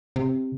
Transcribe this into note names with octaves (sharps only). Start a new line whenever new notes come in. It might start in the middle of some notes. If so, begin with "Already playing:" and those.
C3